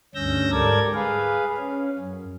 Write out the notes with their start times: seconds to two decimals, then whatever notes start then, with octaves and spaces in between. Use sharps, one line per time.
0.15 D2 G2 C#4 E6 G6 A#6
0.52 G#2 G3 A4 A#4 D5 G#6
0.95 G#4 B4 F5
1.58 C#4
1.99 F#2